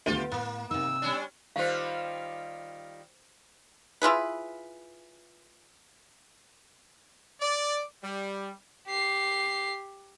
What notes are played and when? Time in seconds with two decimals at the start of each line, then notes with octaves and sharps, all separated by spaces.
0.06 D2 A3 B3 F4 G4 E5
0.32 A2 A#3
0.71 C3 D#4 E6
1.02 G3 C#4 D4
1.56 D#3 G3 F4 C5 F5
4.02 E4 F4 G#4 B4
7.41 D5
8.03 G3
8.87 G4 C7